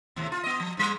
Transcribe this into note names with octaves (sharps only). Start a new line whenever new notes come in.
D#2 A2 C3
F4
B3 D#5
F3
G#2 G3